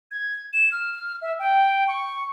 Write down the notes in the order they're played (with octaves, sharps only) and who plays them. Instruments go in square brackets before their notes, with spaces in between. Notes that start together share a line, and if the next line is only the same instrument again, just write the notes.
[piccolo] G#6
E7
F6
E5
G5
C#6